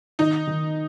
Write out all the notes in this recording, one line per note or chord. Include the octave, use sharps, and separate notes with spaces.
D#3 D#4
D#3